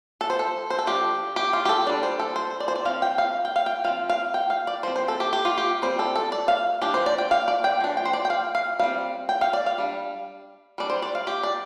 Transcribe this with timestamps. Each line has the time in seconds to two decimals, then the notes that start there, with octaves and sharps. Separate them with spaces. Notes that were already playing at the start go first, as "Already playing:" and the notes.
0.21 A4
0.30 C5
0.39 A4
0.70 C5
0.78 A4
0.87 F3 D4 G4
1.36 G4
1.53 F4
1.65 G4
1.69 A4
1.86 G3 D4 D5
2.03 C5
2.20 A4
2.36 C5
2.60 D5
2.68 C5
2.76 D5
2.85 F3 C4 F5
3.02 G5
3.18 F5
3.45 G5
3.56 F5
3.66 G5
3.84 F3 C4 F5
4.09 F5
4.34 G5
4.50 F5
4.67 D5
4.83 F3 C4 C5
4.96 C5
5.08 A4
5.20 G4
5.33 G4
5.45 F4
5.58 G4
5.82 G3 C4 C5
5.99 A4
6.16 A4
6.32 D5
6.48 F5
6.82 F3 D4 G4
6.94 C5
7.06 D5
7.18 G5
7.31 F5
7.48 D5
7.64 G5
7.80 F3 D4
7.97 G5
8.05 C5
8.13 D5
8.25 G5
8.30 F5
8.55 F5
8.79 G3 C4 F5
9.29 G5
9.41 F5
9.53 D5
9.66 F5
9.78 G3 D4
10.78 G3 D4 D5
10.90 C5
11.02 D5
11.15 F5
11.27 G4
11.43 D5